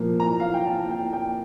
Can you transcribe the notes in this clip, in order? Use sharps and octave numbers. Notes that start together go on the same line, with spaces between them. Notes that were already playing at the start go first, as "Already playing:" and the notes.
Already playing: A#2 F3 A#3
A#5
F5
G5
A5
G5
G5